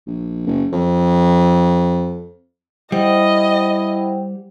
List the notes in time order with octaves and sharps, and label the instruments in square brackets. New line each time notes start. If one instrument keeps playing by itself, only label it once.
[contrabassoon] A#1
F#1
F2
[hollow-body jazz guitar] G3 [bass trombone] E4 [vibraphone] C5 F#5 G5 [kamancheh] D#5